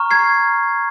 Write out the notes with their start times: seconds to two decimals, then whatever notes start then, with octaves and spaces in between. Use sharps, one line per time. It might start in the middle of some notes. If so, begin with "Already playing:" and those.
Already playing: A#5 C#6 F6
0.11 G#6 C7